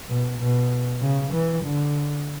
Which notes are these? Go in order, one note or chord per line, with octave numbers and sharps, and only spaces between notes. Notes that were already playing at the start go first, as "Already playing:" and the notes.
B2
B2
C#3
E3
D3